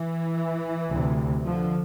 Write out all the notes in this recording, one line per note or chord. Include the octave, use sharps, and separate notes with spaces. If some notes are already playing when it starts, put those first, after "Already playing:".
Already playing: E3
D2 C3
D3 F3